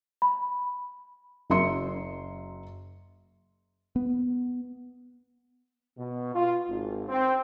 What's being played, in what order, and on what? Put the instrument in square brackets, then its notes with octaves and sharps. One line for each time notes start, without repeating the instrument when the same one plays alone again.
[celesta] B5
[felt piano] F#1 F#3 A#4 E5 C6 C#7
[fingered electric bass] B3
[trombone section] B2
F4
G#1
C4